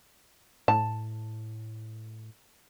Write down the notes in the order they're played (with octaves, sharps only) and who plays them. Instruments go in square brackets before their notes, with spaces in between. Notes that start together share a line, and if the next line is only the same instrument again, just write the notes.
[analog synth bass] A2 [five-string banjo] A5